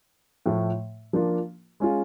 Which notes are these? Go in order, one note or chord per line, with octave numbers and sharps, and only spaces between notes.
A2 F3 A3
F3 A#3 D4 F4
G#3 C#4 F4